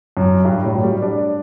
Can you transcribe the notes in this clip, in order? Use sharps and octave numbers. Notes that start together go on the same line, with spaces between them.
F#2
G2
A2
F#3
G3
D4